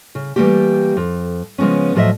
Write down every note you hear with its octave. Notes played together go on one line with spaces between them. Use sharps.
C#3
E3 F3 G3 A3 A#3 G4
F2
C#3 F3 G#3 B3 C#4
A2 F3 F#3 A4 D#5 E5